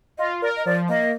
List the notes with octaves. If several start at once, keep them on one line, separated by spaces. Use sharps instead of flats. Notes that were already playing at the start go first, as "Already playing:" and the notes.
F4 D#5
A#4 D5
D#5
F3 D5
A#3 D#5